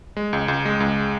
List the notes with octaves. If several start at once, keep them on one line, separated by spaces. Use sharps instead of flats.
G#3
C#2
C#2
G#3
C#2